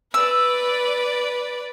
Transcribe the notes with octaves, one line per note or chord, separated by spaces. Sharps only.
B4 D5 E6